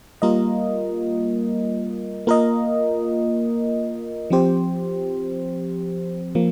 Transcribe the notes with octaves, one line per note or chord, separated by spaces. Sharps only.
G3 A#3 F4 A#4 D#5
A#3 F4 A#4 D#5
F3 C4 G4 C5
F3 A#3